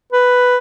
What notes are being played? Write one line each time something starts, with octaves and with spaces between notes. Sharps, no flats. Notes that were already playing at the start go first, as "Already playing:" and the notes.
B4